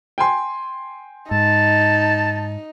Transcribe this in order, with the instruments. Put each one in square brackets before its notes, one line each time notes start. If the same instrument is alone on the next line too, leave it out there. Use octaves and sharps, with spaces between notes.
[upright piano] G5 G#5 C6
[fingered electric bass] G#2 [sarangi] D#4 [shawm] A5